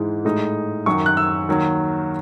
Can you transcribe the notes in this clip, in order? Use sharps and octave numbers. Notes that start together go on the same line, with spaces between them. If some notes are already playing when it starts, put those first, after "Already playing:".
Already playing: G#2 E3 G#3 D#4
A2 G#3 D#4
F#2 D#3 F#3 C#6
F#6
E6
D#2 D#3 F#3